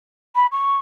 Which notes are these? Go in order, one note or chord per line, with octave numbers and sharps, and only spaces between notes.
B5
C#6